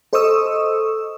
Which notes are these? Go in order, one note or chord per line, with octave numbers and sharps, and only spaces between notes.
A4 C5 D#5 C#6 D#6 E6